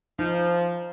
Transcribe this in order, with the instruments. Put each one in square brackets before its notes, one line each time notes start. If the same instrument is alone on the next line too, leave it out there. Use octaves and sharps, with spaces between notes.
[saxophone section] F3 [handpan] D#4